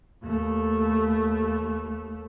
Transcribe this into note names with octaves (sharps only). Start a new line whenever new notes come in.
D#2 A3